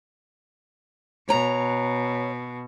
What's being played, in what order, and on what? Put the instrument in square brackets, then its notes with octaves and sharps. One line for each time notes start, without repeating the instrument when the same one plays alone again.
[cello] B2 [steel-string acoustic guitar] C#5 A#5